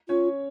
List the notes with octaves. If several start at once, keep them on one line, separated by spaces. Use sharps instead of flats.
C#4 F4 C#5